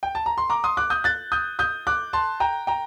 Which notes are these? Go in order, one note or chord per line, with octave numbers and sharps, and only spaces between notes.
G5
A5
A#5
C6
A#5 D6
C6 D#6
D6 F#6
D#6 G6
F#6 A6
D#6 G6
D#6 G6
D6 F#6
A5 C6
G5 A#5
G5 A#5